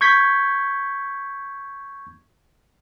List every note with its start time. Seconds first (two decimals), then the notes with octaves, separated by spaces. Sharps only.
0.01 C#6 G6 G#6 B6